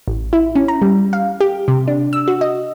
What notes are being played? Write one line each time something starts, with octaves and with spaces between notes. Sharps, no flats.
A1
E4
C#4
A#5
G3
F5
G4
C3
D4
E6
F#4
D#5